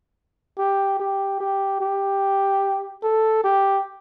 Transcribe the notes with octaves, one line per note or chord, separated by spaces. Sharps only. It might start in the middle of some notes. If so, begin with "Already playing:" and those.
G4
G4
G4
G4
A4
G4